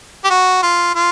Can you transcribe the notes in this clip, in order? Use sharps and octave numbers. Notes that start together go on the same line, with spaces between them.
G4
F#4
F4
F4